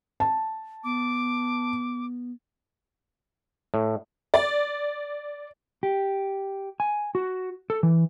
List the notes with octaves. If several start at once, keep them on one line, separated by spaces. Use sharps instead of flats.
A5
B3 D6
A2
D5
G4
G#5
F#4
A4
E3